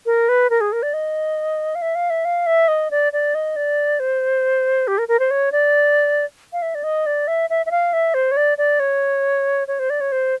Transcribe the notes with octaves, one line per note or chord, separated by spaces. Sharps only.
A#4
B4
A#4
G#4
A#4
D5
D#5
F5
E5
F5
E5
F5
E5
D#5
D5
D5
D#5
D5
C5
G4
A#4
A#4
C5
C#5
D5
F5
E5
D5
D#5
D5
E5
E5
E5
F5
E5
C5
C#5
D5
D5
C#5
C#5
C5
D5
C#5
C5